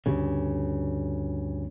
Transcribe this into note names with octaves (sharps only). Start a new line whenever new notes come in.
D2 G2 C#3